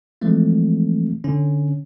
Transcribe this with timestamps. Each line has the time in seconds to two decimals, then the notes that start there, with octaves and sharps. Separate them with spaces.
0.21 E3 F3 G#3 A3 C4
1.24 D3 C#4